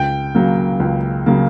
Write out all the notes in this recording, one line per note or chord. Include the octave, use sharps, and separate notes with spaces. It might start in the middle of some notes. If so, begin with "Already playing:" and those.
Already playing: C#2 G5
C#3 F#3 A#3
C#2
C#3 F#3 A#3